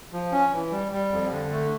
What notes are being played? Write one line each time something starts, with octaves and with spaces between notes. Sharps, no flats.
F3
C#4
E3
G3
G3
F2
D3
A3